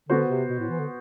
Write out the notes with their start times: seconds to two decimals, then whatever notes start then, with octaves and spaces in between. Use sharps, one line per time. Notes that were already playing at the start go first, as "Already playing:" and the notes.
0.09 D3 B3 F#4 C5
0.29 C3
0.49 B2
0.60 A2
0.70 E3
0.79 D3